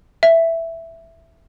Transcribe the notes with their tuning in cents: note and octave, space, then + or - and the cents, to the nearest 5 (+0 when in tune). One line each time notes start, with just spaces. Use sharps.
E5 +5